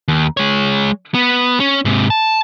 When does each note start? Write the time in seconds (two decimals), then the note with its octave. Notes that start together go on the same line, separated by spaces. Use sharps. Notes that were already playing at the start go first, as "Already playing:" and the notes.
0.08 D#2
0.37 G#3 C#5
1.14 B3
1.60 C#4
1.85 G#2 C3
2.10 A5